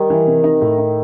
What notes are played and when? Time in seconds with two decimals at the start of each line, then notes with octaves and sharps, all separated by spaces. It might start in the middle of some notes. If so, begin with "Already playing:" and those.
Already playing: D#3 G3
0.10 E3
0.27 C3
0.44 D#4
0.62 A2
0.78 D#4